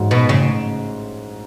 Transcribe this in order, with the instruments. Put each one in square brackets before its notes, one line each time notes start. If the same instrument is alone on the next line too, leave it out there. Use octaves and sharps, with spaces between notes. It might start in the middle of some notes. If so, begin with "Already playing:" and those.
Already playing: [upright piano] A1 G#2 F#3
[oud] B2
[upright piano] A1 [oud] C#3